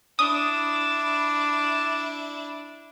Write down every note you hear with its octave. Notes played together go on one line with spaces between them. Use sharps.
D4 E4 D#6